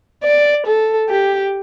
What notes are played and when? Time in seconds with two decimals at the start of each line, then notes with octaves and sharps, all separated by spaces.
0.24 D5
0.67 A4
1.10 G4